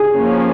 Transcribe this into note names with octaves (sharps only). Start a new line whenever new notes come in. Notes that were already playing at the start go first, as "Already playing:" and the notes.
Already playing: G#4
F3 A#3 C#4